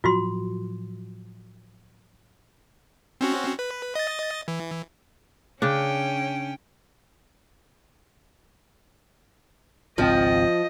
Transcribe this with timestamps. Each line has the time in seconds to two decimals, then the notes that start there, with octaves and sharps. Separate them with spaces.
0.04 A2 F3 F#3 F4 F#4 C6
3.21 C4 C#4 F#4
3.59 B4
3.95 D#5 A6
4.48 E3
5.62 C#3 C#4 D4 G5
9.98 G#1 C#2 F3 C4 D#5